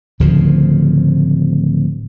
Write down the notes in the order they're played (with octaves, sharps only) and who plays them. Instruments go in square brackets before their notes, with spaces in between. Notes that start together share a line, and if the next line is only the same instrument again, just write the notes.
[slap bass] D1 D2 C#3 F3